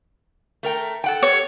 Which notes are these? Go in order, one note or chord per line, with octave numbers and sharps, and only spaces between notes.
A3 A#4 G5
A4 F#5 G5
C#5